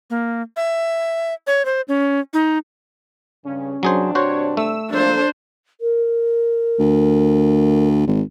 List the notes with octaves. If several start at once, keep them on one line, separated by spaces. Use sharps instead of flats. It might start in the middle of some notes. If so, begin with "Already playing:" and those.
A#3
E5
C#5
C5
C#4
D#4
G2 C#3 C#4
G2 C3 F#3 D4 G#4 C5
F#4 C5 C#5
A3 E6
F3 A#3 D4 A4 C5
A#4
D2
G#1